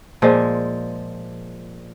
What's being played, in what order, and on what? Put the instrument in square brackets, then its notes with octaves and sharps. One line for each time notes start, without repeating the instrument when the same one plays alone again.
[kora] A#2 F3 G#3